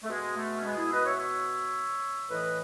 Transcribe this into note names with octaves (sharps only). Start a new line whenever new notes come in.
A3
B2 G#3
A3
C#4
G#3 B3
E4 G#4
E5
B4 D#5
C#5 E5
C#5 E5
A2 E3 B4 D#5